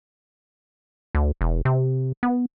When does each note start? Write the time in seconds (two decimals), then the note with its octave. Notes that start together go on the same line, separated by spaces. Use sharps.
1.15 D2
1.41 E1
1.65 C3
2.23 B3